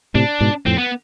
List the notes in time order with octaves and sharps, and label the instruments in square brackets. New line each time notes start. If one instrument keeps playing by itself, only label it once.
[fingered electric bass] A2 C3 [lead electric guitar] D4
[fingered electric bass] G#2 B2
[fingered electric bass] F2 A2 [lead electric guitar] C4
[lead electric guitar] B3